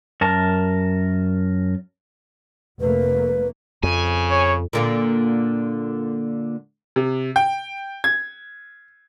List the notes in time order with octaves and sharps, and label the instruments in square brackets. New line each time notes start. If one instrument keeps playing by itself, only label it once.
[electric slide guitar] F#2 A#4 A5
[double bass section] F1 A3 A#3 [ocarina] B4
[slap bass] F2 [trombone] C#3 [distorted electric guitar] G#5
[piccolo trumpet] C#5
[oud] A#2 D3 A#3
[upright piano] C3
G5
G#6